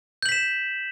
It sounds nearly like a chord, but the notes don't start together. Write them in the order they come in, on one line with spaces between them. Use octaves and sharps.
G6 F#7 B6 E7